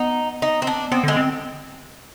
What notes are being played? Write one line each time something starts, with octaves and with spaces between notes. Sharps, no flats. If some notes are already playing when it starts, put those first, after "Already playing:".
Already playing: B3 D#4
D#4
C4
D4
B3 C4
D3 G#3
C4